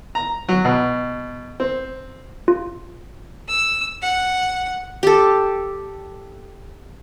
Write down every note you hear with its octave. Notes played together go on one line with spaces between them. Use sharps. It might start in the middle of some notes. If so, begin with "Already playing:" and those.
A#5
F#3
B2
C4
F4
E6
F#5
G4 A4